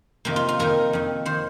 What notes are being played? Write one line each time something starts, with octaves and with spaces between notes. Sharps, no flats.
F2 C3 D#3 A#3
F4
F4
F2 D#3 A#4
F2 D#3
D#3 C5